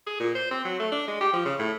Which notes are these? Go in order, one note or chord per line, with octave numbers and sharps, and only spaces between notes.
G#4
A#2
C5
C4
F#3
A3
D4
G#3
G4
F3
C#3
A2